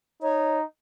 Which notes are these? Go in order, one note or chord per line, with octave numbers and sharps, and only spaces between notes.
D#4 C#5